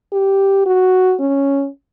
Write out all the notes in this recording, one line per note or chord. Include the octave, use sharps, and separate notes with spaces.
G4
F#4
C#4